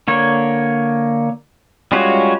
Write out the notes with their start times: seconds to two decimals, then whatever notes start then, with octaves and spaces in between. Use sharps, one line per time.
0.08 D3 A#3 C#5
1.92 G3 G#3 C#4 F4 F#4